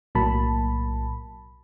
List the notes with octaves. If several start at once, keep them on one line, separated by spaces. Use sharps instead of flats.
B1 A2 F#3 A#3 A5 B5